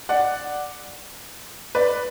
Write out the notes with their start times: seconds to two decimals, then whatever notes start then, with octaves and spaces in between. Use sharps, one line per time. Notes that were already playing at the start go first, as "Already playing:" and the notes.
0.09 D5 F#5
1.75 B4 D5